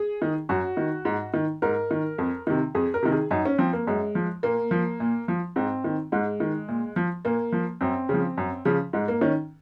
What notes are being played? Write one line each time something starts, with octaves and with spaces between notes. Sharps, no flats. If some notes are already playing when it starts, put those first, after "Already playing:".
Already playing: G#4
D#3
F#2 F#4
D#3
G#2
D#3
G#2 A#4
D#3
F2
C3 D#3
F2 G#4
A#4
C3 D#3
G#4
F#2 D#4
C#4
F3 C4
A#3
F#2 G#3
F3
A#2 A#3
F3
A#2
F3
G#2 C4
D#3
G#2 G#3
D#3
A#2
F3
A#2 A#3
F3
F#2 C4
C#3 F3
F#2
C#3 F3
G#2 G#3
A#3
D#3 C#4